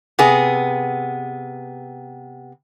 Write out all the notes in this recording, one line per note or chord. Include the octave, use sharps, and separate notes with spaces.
C3 B3 G#4